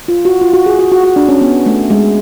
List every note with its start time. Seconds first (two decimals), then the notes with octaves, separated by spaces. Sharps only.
0.08 F4
0.25 F#4
0.41 F4
0.54 F#4
0.66 G#4
0.79 F#4
0.92 F#4
1.04 F#4
1.16 D4
1.29 C#4
1.41 B3
1.66 A3
1.90 G#3